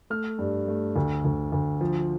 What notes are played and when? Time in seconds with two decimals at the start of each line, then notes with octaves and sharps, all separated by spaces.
0.10 A3 F6
0.39 G2
0.68 A3
0.96 D2
1.24 D2
1.52 D2
1.81 F3